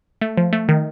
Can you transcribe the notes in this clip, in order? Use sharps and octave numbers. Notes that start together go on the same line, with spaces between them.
A3
F3
A3
D#3